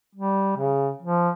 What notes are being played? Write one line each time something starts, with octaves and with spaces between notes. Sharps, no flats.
G3
C#3
F3